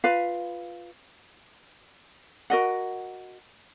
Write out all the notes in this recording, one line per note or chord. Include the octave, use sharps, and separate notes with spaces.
F4 B4 F5
F#4 A#4 D#5 F#5